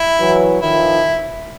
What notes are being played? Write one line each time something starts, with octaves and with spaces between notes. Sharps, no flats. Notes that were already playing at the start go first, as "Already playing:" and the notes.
Already playing: E4
E3 F#3
D#3 F3 E4